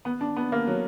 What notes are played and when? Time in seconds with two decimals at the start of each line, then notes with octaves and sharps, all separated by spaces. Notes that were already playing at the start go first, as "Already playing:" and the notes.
0.05 B3
0.21 D4
0.36 B3
0.52 A#3
0.67 F#3